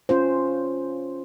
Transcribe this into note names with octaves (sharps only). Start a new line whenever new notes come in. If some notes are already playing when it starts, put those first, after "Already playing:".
C#4 F4 C5